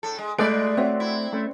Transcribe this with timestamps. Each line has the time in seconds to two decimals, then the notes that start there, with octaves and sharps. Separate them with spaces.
0.03 A2 A4
0.18 G#3
0.38 A#2 G#3 A3 A4 D5 B5 F#6 D7
0.77 C4 F#4 C#5 E5
1.00 E4
1.33 A3 C#4